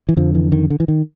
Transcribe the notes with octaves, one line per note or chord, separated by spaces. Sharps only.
E3
F2 D3 F3
E3
D#3
D3
E3
D#3